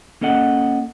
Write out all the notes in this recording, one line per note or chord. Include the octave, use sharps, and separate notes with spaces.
A#3 C#4 A4 D#5 F#5